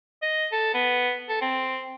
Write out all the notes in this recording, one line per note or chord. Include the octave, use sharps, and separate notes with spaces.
D#5
A4
B3
A4
C4